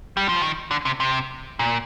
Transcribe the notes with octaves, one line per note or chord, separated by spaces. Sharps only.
G3
F3
D#3
D3
C3
C3
A#2